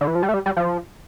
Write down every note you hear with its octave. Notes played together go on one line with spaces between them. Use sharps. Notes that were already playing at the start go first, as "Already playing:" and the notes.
D3
E3
F3
G3
A3
G3
G3
F3